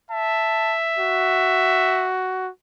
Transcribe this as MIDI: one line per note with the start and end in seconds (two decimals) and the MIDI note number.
0.11 2.12 76
0.11 0.75 81
0.98 2.50 66